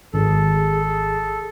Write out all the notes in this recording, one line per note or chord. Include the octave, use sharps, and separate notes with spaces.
G#1 G#4 A4